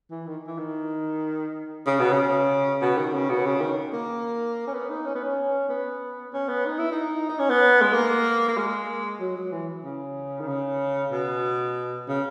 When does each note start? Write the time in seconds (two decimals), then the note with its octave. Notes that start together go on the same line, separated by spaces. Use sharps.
0.11 E3
0.27 D#3
0.47 E3
0.58 D#3
1.86 C#3
2.00 B2
2.12 C#3
2.81 B2
2.97 D#3
3.14 C#3
3.30 B2
3.46 C#3
3.61 D#3
3.93 A#3
4.67 C#4
4.74 B3
4.90 D#4
5.05 C#4
5.15 B3
5.23 C#4
5.69 B3
6.33 C#4
6.49 B3
6.65 D#4
6.78 E4
6.92 D#4
7.29 D#4
7.39 C#4
7.50 B3
7.82 G#3
7.93 A#3
8.48 A#3
8.57 G#3
9.20 F#3
9.37 F#3
9.52 E3
9.84 C#3
10.40 D#3
10.48 C#3
11.12 B2
12.08 C#3